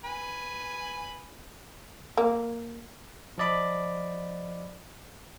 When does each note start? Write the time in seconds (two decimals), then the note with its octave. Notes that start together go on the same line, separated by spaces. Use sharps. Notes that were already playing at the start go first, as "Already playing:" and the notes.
0.04 B4 G#5
2.17 A#3
3.38 F3 F4 D5 D#5 B5 D6